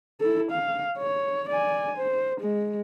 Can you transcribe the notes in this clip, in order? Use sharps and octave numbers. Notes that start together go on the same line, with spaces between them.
E4 A4
F5
C#5
D5 G#5
C5
G#3